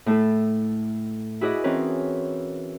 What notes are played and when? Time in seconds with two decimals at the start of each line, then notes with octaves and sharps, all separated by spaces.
0.06 A2 A3 E4 A4
1.41 E4 F#4 G#4 B4 D5 D#5
1.64 E3 C4 C#4 A#4 B4